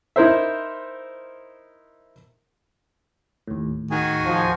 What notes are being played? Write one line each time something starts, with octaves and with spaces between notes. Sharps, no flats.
D#4 E4 A#4 C5 E5
D#2 A2
D#3 F#4 G#4 G#5
F3